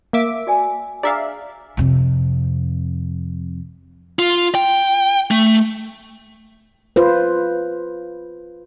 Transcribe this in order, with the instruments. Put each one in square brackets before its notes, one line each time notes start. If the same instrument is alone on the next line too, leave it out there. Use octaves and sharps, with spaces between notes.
[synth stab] A#3 E5 D6
[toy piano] F#4 D5 G#5
[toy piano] D4 G#4 A#5 [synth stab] D5 E5 F5
[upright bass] F2 C3
[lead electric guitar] F4
G5
A3
[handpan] F4 B4 C5